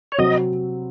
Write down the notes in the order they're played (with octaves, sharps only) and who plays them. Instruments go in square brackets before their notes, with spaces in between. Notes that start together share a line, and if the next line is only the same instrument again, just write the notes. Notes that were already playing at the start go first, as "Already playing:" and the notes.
[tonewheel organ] C#5
[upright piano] C3 F#3 C4 [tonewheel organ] D#5